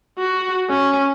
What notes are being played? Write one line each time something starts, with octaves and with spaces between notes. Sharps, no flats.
F#4
C#4